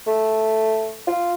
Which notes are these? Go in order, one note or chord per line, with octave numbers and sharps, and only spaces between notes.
A3
F4